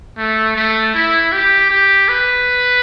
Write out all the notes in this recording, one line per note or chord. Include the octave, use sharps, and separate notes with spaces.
A3
A3
E4
G4
G4
B4